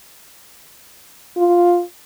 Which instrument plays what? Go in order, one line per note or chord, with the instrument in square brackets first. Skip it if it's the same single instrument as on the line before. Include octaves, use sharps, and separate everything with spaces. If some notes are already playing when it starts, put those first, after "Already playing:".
[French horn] F4